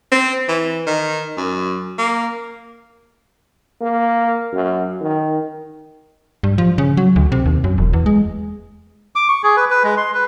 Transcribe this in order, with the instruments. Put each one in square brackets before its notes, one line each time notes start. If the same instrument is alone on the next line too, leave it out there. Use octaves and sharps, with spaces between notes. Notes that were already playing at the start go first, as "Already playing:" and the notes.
[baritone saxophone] C4
E3
D#3
F#2
A#3
[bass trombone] A#3
F#2
D#3
[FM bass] G2
F3
C#3
F#3
D2
C3
D#2
F#2
E1
E2
G#3
[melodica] D6
C#6
G#4
B4
B4
G#3
C6
B4